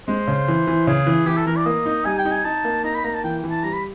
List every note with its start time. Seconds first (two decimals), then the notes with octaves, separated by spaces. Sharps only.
0.08 G#3 C5
0.27 C#3
0.48 E3
0.67 E3
0.87 C#3 G#4
1.07 E3
1.26 E3 G4
1.37 A4
1.46 E3 A#4
1.56 D5
1.66 A#3 D#5
1.86 D#4
2.05 G3 G#5
2.19 G5
2.25 D#4
2.31 G#5
2.45 D#4 A5
2.65 A#3
2.84 D#4 A#5
2.95 B5
3.04 A#3 A#5
3.14 A5
3.24 E3 G5
3.44 E3
3.50 A5
3.63 G3 A#5
3.73 B5